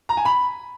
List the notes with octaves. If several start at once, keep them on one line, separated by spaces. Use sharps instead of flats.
A#5
G#5
B5